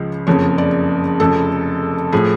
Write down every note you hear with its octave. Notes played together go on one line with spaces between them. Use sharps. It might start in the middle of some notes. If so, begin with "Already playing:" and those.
Already playing: C#2 C#3 F3
F#1 F2 C#3 C#5
D5
F1 F2 C#3 A4
A2 F3 G#4